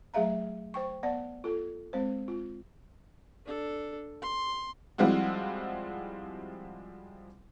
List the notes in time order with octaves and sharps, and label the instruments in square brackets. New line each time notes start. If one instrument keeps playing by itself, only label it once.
[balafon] F#3 A3 G#4 E5 F5 A#5
C5 G5 C#6
B3 D5 F#5
F4 A4
G#3 C4 C5
F4
[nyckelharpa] D4 A4
C6
[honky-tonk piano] F3 G3 G#3 C4 E4 F#4